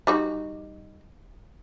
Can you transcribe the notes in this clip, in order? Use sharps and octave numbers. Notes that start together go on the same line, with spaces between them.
G3 D#4 F#4